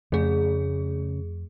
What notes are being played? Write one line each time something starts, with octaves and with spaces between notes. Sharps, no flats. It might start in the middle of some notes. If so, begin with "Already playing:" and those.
F2 C#3 A3 G#4